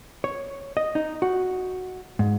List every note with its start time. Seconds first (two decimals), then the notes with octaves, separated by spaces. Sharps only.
0.24 C#5
0.77 D#5
0.95 D#4
1.22 F#4
2.19 G#2